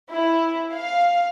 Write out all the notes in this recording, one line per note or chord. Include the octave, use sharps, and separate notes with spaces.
E4
F5